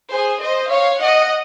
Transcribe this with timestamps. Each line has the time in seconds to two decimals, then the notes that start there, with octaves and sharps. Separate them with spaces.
0.12 G#4 C5
0.42 C5 D#5
0.71 C#5 F5
1.01 D#5 F#5